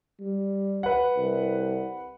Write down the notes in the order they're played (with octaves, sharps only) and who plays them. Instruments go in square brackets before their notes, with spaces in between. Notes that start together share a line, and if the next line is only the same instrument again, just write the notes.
[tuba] G3
[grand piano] B4 F#5
[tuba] C2